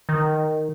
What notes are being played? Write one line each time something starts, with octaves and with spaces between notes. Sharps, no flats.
D#3